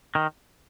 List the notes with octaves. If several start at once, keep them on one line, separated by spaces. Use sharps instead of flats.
D#3